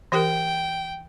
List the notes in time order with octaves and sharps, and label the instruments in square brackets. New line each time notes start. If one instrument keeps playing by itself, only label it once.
[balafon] E3 G4 A#4 [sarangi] G5